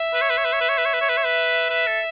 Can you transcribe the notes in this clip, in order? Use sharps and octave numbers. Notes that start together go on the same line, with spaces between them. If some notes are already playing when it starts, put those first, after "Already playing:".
Already playing: E5
B4
C#5
B4
C#5
B4
C#5
B4
C#5
B4
C#5
B4
C#5
B4
C#5
B4
B4
A4